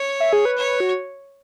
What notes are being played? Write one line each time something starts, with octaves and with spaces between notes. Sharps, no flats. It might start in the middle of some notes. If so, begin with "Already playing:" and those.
Already playing: C#5
E5
G#4
B4
C#5
F#4